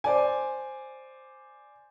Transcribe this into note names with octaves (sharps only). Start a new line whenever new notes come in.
C5 D5 G#5